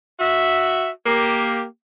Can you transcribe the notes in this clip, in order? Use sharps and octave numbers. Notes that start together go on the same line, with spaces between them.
F#4 E5
A#3 G4